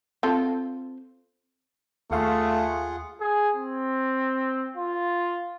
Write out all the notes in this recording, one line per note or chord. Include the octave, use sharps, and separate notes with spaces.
C4 F4 A4
D#2 A3 F4 G#4 F5 F#5 C6
G#4
C4
F4